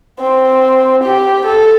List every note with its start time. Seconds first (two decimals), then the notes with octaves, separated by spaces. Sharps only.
0.19 C4
1.04 G4
1.47 A4